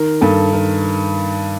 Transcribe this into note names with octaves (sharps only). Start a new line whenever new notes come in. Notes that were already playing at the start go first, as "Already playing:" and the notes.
Already playing: D#3 A#4
G2 A4
D#3 A#4